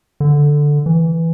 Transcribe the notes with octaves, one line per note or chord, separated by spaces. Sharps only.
D3
E3